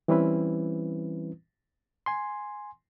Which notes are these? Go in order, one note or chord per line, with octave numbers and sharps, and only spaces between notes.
E3 G3 C4 C#4 E4 B4
G#5 C6